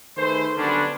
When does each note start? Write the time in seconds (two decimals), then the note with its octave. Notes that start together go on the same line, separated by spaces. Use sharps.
0.17 D#3 A3 G#4 B4 C5
0.57 D3 F#3 G3 B3 C#4 D4